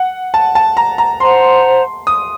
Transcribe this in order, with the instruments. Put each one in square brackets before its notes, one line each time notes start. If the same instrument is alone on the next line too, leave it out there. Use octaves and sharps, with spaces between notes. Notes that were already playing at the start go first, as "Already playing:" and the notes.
Already playing: [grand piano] F#5
A5
A5
A#5
A#5
[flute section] C5 F#5 A#5 [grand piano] C6
[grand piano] D#6